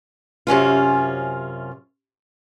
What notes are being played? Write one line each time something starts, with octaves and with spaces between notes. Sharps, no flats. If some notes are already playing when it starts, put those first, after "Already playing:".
F#2 C3 C#4 F4